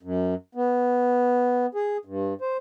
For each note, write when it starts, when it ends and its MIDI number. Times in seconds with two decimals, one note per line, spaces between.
0.03 0.34 42
0.55 1.66 59
1.75 1.97 68
2.05 2.34 43
2.41 2.57 72